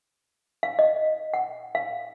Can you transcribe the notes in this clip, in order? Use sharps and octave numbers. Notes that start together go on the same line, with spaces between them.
F5
D#5
F#5
F5